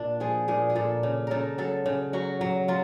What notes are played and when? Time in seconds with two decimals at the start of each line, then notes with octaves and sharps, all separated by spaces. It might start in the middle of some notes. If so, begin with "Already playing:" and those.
Already playing: A#2 D4
0.20 F3 G#4
0.48 A#2 G#4
0.70 G#4
0.75 A#2 A4
1.03 C#3
1.27 C#3 A4 A#4
1.58 F#3 A4
1.86 C#3
2.13 F#3 F#4
2.41 F#3
2.68 F#3 F4